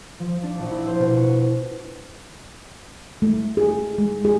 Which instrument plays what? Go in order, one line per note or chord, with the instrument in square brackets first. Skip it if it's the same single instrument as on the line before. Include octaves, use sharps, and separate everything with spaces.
[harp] F3
D4
A#1
E4
C5
B2
F#4
[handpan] A3
G#4
G#3
G#4